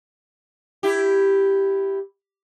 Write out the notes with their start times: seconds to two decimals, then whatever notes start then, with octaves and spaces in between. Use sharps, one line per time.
0.83 E4 G4